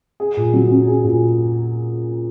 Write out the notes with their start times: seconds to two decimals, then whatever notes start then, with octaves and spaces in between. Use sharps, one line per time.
0.20 G#4
0.37 A#2
0.54 F#3
0.71 C#4
0.87 G#4
1.04 A#2